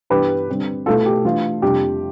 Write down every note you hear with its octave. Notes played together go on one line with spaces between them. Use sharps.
G2 E3 B3 D4 G4 B4
D3 G3 C4
B2 A3 E4 F4 A4
G4
E3 A3 D4 F4
F2 C3 G3 D4 F4 G4